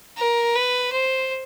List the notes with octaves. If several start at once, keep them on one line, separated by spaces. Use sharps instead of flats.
A#4
B4
C5